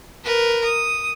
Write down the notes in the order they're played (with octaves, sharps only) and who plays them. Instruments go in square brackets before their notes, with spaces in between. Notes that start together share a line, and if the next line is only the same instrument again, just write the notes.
[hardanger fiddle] A#4 B4
D#6